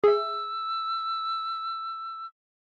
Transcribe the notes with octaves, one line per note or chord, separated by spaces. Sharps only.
G#4 E5 E6